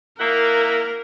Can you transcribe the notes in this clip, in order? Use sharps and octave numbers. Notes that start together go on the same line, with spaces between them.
A#3 E4 A#4 F#5